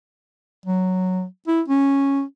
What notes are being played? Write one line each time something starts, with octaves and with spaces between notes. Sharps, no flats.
F#3
E4
C#4